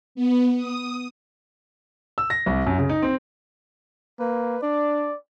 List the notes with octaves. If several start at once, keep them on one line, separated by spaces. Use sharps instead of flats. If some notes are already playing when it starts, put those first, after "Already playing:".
B3
D#6
E6
A#6
C2
F#2
C#3
D#4
C4
A#3 B4
D4 D5